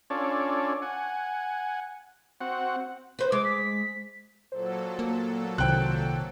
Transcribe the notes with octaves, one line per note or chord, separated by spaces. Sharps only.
C#4 D4 F4 A4 C#5 D5
F#5 G#5
C4 F#4 F#5
B4 C5
G#3 D6
B6
A#2 F#3 A4 C5
A#3
C2 C3 D#3 C5 G5 F#6